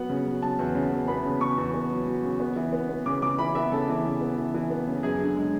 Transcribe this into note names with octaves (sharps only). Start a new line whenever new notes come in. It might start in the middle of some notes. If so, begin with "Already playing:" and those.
Already playing: F#3 B3 F#5
C#3
F#3
C#3 A5
E2
C#3
E2
B3 B5
C#3
C#3 C#6
E2
B3
F#3
F#3
C#3
B3
E3
B3
B3
C#3 D6
C#3 D6
E3 B5
B3 E5
C#3 A4
E3
C#3
B3
E3
E3
B3
C#3
F#2 G#4
D3
G#3